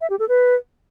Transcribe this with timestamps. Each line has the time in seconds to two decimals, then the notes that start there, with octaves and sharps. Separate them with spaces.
0.01 E5
0.10 G4
0.19 A4
0.28 B4